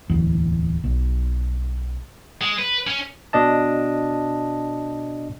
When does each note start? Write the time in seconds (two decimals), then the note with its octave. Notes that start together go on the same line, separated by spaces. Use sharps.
0.10 D1 E2
0.84 B1
2.41 G#3
2.59 B4
2.87 C#4
3.33 B2 D4 D#5 A5